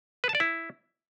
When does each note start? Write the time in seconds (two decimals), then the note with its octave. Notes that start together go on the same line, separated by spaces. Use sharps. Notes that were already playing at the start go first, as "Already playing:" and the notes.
0.24 B4
0.29 A5
0.35 D5
0.40 E4